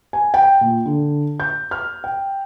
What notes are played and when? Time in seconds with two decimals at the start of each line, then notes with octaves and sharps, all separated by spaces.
0.13 G#5
0.34 G5
0.61 A#2
0.86 D3
1.40 G6
1.71 F6
2.04 G5